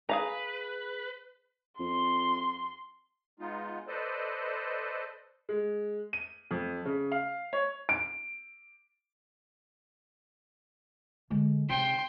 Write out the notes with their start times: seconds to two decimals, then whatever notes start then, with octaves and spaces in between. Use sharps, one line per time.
0.09 G#4 B4 F5 A#5
1.80 F2 C6
3.40 G#3 B3 D#4 F4
3.88 A4 B4 C5 D5 D#5
5.49 G#3
6.13 D#7
6.51 F2
6.85 C#3
7.12 F5
7.53 C#5
7.89 D7
11.30 D3 G#3
11.69 C3 G5 C6